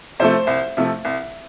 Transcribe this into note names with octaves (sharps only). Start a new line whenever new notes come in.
C3 F3 A3 C5
C2
C3 F3 A3
C2